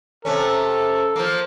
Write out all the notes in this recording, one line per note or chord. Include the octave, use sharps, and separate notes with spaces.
C3 A3 C#4 A4
F3 A#3